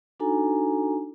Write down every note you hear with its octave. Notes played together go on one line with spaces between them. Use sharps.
D4 D#4 F#4 A4 G#5 A#5